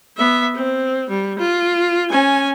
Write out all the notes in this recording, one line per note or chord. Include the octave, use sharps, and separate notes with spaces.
B3 E5
C4
G3
F4
C#4 G#5